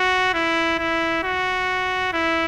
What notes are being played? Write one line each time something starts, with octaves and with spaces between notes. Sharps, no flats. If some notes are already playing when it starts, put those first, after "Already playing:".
Already playing: F#4
E4
E4
F#4
E4